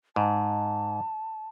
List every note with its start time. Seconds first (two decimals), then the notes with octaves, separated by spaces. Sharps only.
0.16 G#2 A5